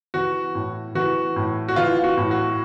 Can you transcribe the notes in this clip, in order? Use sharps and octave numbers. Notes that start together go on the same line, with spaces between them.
E3 F#4
A2
E3 F#4
A2
F#4
E3 F4
F#4
A2
F#4